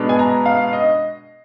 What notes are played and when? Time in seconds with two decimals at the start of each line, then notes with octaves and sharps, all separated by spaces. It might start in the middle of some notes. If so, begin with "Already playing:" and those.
Already playing: B2 G#3 B3 D4
0.09 G#5
0.19 A#5
0.46 F5
0.73 D#5